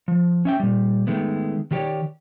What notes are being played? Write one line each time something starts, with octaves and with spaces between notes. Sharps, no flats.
F3
C#4 E5 G5
A#2 G3
D#3 G#3 A3 B3
D#3 F#3 G4 A#4 C#5 D5